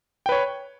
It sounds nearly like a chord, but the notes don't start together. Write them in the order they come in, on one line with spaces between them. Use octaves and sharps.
G5 B4 C#5